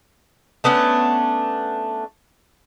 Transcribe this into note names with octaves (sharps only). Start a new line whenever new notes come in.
A3 B3 C#4 D4